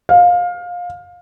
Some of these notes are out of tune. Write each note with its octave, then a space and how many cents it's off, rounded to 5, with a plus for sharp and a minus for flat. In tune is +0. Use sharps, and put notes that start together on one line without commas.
F5 +20